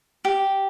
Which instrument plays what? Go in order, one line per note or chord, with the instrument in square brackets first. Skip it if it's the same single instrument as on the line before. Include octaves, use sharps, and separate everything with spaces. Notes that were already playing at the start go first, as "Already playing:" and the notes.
[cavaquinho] G4